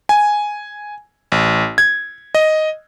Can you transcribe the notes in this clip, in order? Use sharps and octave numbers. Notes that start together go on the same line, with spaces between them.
G#5
A1
G#6
D#5